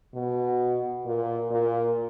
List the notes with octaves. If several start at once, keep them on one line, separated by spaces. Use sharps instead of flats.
B2
A#2
A#2